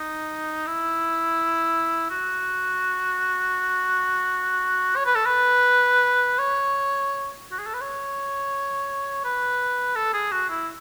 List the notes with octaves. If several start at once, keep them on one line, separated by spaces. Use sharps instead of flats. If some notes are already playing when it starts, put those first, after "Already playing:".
Already playing: D#4
E4
F#4
C#5
B4
A4
B4
C#5
F#4
G#4
A4
B4
C#5
B4
A4
G#4
F#4
E4